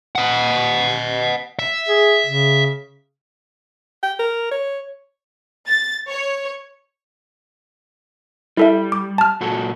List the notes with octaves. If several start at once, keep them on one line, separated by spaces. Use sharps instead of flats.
D#5 F#5
E5
G#4
C#3
G5
A#4
C#5
A6
C#5
G3 E4 A4 E5
D6
A5 F6
A#2 F#4 A4